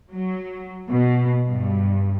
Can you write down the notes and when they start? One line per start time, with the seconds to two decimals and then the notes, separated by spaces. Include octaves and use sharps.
0.13 F#3
0.89 B2
1.51 G2